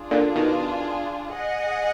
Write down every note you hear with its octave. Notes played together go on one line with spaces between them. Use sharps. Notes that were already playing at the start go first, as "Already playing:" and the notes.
Already playing: D4 F4 G#4
A#2 D3
B2 D#3
G#4 D#5 F#5